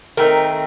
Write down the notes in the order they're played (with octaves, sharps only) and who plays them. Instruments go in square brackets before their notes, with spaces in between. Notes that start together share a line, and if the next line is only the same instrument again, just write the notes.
[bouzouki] D#3 A3 C4 A#4